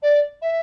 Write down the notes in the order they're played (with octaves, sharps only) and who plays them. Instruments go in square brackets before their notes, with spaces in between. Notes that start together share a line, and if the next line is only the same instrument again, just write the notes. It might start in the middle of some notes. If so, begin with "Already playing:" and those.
[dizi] D5
E5